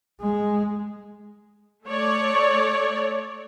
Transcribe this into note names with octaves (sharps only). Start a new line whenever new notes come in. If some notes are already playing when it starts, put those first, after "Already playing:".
G#3
A3 C#5 D5